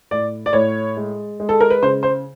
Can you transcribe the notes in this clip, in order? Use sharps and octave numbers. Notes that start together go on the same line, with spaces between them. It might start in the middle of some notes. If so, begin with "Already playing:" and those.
A2 D5
D5
A2 C#5
G#3
G#3
A4
A#4
B4
C#3 C5
C5